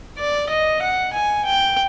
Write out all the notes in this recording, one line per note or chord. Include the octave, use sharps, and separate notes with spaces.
D5
D#5
F#5
G#5
G5